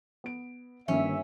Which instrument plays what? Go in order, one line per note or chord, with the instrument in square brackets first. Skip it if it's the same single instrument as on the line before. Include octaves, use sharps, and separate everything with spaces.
[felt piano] B3 D7
[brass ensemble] G1 E5 [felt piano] D#3 A#3 [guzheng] C#4